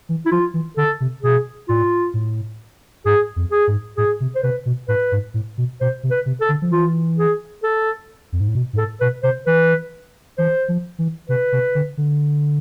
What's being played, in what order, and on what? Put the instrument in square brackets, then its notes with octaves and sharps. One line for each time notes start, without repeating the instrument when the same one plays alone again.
[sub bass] E3
[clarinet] E4
[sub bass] F3 [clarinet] F4
[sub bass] E3
[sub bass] D3 [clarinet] A4
[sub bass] C3
[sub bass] B2 [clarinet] G#4
[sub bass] A2 [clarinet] F4
[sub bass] A2
[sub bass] G#2 [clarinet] G#4
[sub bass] F2
[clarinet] G#4
[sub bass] G#2
[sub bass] A2 [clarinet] G#4
[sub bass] C3
[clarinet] C5
[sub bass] C3 [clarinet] B4
[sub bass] B2
[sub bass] A2 [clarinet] B4
[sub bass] G#2
A2
B2
[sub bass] B2 [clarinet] C5
[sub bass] C3
[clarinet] B4
[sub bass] C3
[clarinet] A4
[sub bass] D3
F3
[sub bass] E3 [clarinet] F4
[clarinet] G#4
A4
[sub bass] F2
G#2
A2
B2
G#2
[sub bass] A2 [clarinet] A4
[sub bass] B2 [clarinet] B4
[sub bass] C3 [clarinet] C5
[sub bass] E3 [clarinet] B4
[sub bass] E3 [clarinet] C5
[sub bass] F3
E3
[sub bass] C3 [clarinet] B4
[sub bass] C3
D3
D3